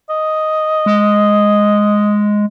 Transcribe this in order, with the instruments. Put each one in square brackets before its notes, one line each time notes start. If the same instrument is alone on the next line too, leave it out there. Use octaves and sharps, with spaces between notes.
[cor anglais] D#5
[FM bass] G#3